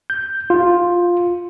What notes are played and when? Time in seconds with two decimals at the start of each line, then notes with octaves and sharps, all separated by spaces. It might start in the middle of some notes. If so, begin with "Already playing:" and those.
0.10 G6
0.50 F4